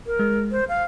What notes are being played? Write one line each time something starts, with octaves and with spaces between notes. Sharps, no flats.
A#4
G#3
C5
F5